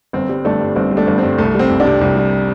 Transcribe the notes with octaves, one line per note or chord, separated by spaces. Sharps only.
G1 C4
G3
G1 A3 D4
G2
G1 C4
G3
A3 D4
G1
C4
G2
C2 A3
G3 C4
C2
D4 G4
C3
C2
G3